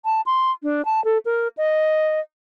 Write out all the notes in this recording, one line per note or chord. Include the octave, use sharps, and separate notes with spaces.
A5
C6
D4
A5
A4
A#4
D#5